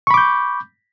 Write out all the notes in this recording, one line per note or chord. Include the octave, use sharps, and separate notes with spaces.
B5 C#6 D6 G6